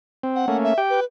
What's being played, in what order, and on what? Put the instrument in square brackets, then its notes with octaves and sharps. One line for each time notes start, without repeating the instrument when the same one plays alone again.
[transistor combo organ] C4
[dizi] F#5
[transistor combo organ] A3 A#3 C#4
[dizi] E5
[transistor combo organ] G4 G5
[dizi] B4